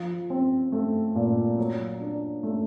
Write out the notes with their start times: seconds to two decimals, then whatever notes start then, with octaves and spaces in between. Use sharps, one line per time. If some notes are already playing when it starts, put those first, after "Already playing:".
Already playing: F3
0.30 C4
0.72 A3
1.15 A#2
1.58 F#3
2.01 D4
2.43 A3